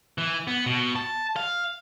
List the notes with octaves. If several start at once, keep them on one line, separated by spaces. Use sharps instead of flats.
E3
B3
B2
A5
F5